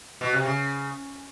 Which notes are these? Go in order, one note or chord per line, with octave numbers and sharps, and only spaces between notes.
B2
C3
C#3